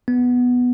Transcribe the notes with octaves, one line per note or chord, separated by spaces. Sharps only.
B3